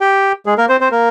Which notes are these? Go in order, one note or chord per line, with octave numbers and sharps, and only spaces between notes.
G4 G5
G#3 G#4
A#3 A#4
C4 C5
C4 C5
A#3 A#4